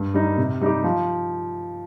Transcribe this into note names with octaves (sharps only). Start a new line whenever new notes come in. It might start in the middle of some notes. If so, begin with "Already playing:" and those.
Already playing: G2
G3 D#4
C3
G3 D#4 G4
F3